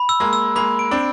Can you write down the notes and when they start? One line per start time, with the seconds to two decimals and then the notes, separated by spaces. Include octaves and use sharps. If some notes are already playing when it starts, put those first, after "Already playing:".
Already playing: B5
0.09 E6
0.20 G#3 A#3
0.33 E6
0.56 G#3 A#3 B5
0.79 D7
0.91 C4 D4